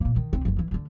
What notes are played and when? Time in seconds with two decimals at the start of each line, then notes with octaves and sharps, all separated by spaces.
0.01 A#2 A#3
0.16 D#3
0.33 C2 C4
0.45 F#1 F2
0.59 E3
0.71 D2 D3